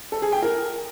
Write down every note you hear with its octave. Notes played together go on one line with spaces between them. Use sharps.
A4
G#4
G5
A#4